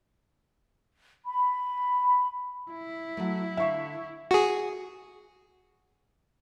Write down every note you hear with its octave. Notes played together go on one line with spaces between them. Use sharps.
B5
E4
F#3 A3
D3 E5 F5 C#6
F#4 G#4